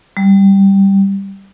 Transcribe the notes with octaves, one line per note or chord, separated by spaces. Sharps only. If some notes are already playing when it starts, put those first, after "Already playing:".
G3